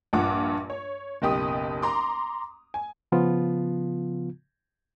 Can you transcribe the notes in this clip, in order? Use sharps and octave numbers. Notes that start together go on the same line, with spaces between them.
A#1 G2 F4 F#5 D6
C#5
F#1 B1 G4 D#6
A#5 C6 D6
G#5
C#3 F3 B3 F4